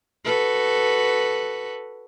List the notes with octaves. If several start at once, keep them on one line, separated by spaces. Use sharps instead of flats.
F#4 A4 B4